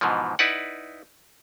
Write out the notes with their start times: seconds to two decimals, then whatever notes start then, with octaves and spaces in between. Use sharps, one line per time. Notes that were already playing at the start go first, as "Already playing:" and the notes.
0.01 G#2 B2 E3 F3
0.39 D#4 E4 B4 D5 F#5